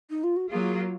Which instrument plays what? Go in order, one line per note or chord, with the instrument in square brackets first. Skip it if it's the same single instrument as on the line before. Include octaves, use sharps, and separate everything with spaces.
[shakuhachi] D#4
F4
F#4
[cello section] F#3 A#3 F4 [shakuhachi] G#4